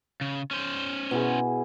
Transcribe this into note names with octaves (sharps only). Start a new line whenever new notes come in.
C#3
C#4 C5
B2 E4 G#4